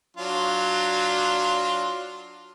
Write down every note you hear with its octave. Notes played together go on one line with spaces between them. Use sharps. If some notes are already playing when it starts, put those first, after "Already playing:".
F#3 D4 F4